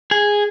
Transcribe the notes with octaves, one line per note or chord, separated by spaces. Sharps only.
G#4